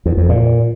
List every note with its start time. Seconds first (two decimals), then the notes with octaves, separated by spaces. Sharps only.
0.06 E2
0.17 F2
0.29 A#2